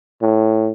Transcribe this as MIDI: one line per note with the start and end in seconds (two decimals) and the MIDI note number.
0.22 0.71 45